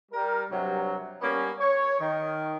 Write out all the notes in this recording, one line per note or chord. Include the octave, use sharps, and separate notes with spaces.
G3 A#4
G2 C3 F#3
G3 A#3 B3 C#4
C#5
D#3